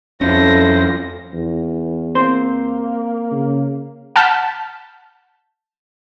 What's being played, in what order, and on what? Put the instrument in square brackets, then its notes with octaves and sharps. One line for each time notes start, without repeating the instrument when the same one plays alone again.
[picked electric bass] F2 C#4 [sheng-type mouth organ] E4 F4 C5 [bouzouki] A4 [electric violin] A#6
[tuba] E2
[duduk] A#3 [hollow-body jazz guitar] C4 C5 C6
[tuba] C#3
[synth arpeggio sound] F#5 A5 F6 G6 B6